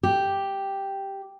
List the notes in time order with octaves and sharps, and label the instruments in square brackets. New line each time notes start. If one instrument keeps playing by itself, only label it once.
[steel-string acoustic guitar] G4